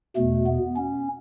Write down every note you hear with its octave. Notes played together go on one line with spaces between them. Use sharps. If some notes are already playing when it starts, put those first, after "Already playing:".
E2 B2 A3
B3
C#4